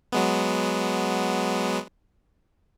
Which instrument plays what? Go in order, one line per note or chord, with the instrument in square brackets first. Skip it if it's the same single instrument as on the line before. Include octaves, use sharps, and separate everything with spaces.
[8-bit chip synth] F#3 G#3 B3